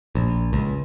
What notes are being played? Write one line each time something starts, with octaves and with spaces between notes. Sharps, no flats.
A#1
C#2